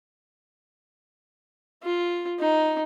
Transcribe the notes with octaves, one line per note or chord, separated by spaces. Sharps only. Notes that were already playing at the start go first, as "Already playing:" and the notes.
F4
D#4